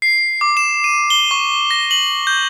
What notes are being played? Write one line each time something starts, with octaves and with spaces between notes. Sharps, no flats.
C7
D6
E7
D#7
G7
C#6
A#6
F#7
G6